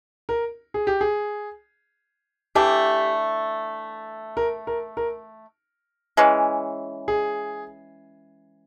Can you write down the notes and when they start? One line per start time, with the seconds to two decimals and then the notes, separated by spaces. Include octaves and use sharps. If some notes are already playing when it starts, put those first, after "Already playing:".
0.29 A#4
0.74 G#4
0.87 G4
1.01 G#4
2.55 E3 A3 D4 G4
4.37 A#4
4.67 A#4
4.97 A#4
6.17 E3 G#3 C#4
7.08 G#4